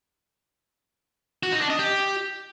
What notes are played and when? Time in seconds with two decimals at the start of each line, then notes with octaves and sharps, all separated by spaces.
1.43 F#4
1.52 D#4
1.61 D4
1.70 D#5
1.79 G4